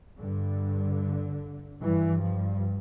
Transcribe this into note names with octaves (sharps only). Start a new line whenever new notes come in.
G2 D3
G2 E3
F3